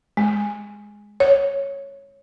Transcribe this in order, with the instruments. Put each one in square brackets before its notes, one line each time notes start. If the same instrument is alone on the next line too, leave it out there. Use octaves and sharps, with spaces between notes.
[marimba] G#3
C#5